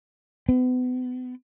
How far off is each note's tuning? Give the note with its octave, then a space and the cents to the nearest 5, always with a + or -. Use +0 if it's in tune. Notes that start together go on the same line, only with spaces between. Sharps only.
B3 +35